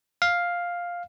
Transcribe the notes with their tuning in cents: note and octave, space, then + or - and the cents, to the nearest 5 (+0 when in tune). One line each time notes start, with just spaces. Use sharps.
F5 +5